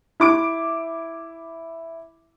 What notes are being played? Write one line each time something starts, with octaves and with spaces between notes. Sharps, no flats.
E4 D6 D7